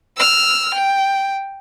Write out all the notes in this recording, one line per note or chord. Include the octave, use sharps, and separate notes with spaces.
E6 F6
G5